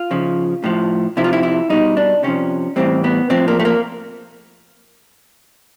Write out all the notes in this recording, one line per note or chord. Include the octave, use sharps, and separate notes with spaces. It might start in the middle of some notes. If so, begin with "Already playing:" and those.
Already playing: F4
C#3 F3
A2 F3
C3 F3 E4
F4
E4
E4
B2 G3 D#4
D4
C3 F3 C#4
A2 E3 G3 C4
B3
A2 F3 C4
A#3
A3
A#3